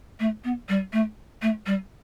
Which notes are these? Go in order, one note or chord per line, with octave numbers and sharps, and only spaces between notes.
A3
B3
G3
A3
A3
G3